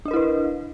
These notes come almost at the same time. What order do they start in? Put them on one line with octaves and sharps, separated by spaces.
D4 D#5 A#4 E4 B4